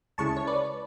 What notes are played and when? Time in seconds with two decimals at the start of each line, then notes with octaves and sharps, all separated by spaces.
0.18 D2 C#3 G#3 C#4 E4 A5 C#6
0.36 C#5
0.47 B4 D5